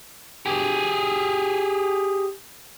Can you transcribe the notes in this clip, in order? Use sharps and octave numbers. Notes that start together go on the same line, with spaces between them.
G4 G#4